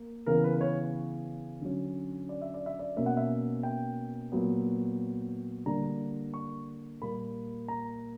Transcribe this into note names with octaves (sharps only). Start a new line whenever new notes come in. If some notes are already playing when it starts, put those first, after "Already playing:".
Already playing: A#3
C#3 E3 B3 A#4
B4
B4
C#5
D3 F#3 C#4
D5
E5
D5
E5
D5
B2 A#3 C#4 E5
F#5
E5
G5
A#2 F#3 B3
D3 G3 A#3 D4 A#5
C#6
A#2 G3 A#3 B5
A#5